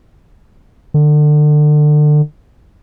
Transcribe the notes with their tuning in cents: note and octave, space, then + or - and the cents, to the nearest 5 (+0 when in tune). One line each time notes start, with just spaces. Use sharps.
D3 +30